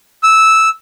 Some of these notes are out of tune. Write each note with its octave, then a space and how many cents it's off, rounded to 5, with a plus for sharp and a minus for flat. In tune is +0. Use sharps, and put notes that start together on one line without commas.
E6 -10